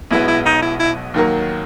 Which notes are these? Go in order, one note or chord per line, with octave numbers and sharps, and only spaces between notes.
B1 B2 G#3 B3 E4
E4
D#4
E4
E4
D#2 D#3 F#3 A#3